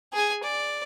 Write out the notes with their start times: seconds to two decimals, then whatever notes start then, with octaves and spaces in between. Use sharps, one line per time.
0.13 G#4 G#5
0.43 D5